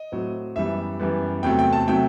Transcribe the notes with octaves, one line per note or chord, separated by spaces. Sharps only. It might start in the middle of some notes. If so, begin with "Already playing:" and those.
Already playing: D#5
A2 F#3 C4
F#2 E3 G3 B3 E5
F#2 E3 G3 B3
E2 C3 F#3 A3 G5
G5
A5
C3 F#3 A3 G5